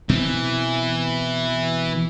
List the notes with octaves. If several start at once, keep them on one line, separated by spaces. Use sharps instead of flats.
B2 E3 C4